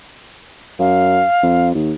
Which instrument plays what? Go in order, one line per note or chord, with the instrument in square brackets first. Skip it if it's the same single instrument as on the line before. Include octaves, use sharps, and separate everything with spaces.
[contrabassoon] F#2 [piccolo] F5
[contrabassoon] F2
D#2